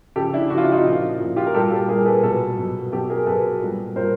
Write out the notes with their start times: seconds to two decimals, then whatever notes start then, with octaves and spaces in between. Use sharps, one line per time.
0.16 C#3 F3 G4 A4
0.33 D4 E4
0.50 C#3 F3 F#4
0.58 F4
0.64 E4
0.72 D#4 F4
0.85 A#2 F3
1.20 A#2 F3
1.36 F4 G4
1.46 A#4
1.54 A#2 G3 G4 A4
1.71 G4 A4
1.88 A#2 G#4 A#4
1.92 G3
2.06 A4 B4
2.23 B2 F#3 A4 B4
2.58 B2 F#3
2.92 B2 F#3 G4 A4
3.10 G#4 A#4
3.26 B2 F#3 A4 B4
3.61 A#2 G3
3.95 A#2 G3 A#4 C5